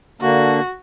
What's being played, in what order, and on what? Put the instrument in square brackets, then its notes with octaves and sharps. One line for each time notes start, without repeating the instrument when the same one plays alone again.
[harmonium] D3 A#3 D4 [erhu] F#4